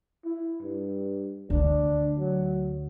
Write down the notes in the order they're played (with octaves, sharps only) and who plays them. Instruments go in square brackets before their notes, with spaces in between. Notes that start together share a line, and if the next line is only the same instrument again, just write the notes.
[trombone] E4
G2
[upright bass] D2 D3 [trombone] D4
[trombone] F#3